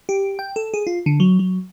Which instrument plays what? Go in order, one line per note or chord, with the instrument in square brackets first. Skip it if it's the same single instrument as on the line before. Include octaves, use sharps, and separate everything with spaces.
[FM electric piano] G4
G5
A4
G#4
F4
D3
F#3
F#3